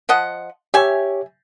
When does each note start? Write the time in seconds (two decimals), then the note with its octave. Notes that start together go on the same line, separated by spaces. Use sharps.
0.09 F3 D#5 F#5
0.74 G4 C#5 E5 G#5